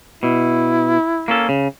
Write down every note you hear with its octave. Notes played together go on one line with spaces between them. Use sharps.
B2 E4
A#3 C#4 A4
C#3